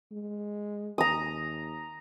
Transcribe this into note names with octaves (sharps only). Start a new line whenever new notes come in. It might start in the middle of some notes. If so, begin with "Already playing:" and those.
G#3
D#2 A#5 D#6